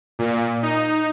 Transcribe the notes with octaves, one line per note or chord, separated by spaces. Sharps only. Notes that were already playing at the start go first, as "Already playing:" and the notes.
A#2
D#4